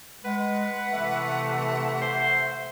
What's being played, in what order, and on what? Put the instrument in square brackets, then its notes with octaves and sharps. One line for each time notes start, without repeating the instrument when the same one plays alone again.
[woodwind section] G#3 [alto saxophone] B4 [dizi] F#5
[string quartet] C3 E3 A3 [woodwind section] E5
[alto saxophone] C5